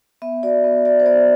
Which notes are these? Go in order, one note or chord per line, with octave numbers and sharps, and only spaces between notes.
B3 E5
F#4 D5
B3
F#4 D5
C5
B3 D5